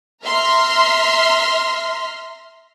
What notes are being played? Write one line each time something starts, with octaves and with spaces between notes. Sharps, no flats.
E5 A#5 C6 F6 B6